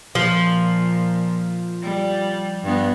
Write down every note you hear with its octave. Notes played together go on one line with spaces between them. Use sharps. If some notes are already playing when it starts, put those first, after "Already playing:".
A#2 F3
G3
G2 B3